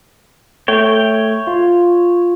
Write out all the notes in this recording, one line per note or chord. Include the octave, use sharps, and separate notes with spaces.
A3 C#5 G5
F4